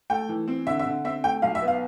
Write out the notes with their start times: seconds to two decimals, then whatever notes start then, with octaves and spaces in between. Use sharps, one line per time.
0.10 A3 G5
0.29 E3
0.48 C4
0.67 D3 E5
0.79 E5
0.86 D3
1.04 C4 E5
1.24 A3 G5
1.42 B1 F5
1.55 E5
1.62 B3
1.68 F5